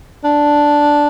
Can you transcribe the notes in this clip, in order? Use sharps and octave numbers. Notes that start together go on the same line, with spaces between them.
D4